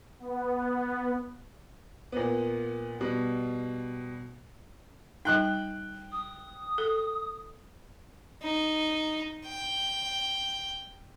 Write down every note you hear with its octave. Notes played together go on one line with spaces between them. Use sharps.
B3
A#2 B3
B2 G3
G3 D#4 G5 F#6
D#6
A4
D#4
G5